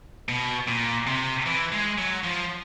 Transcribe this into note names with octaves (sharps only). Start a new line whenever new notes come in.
B2
A#2
C3
E3
G#3
F#3
F3